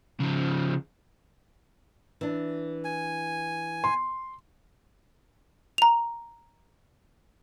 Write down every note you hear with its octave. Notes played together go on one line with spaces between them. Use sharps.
C#3 F3
E3 D4
G#5
C6
A#5 F7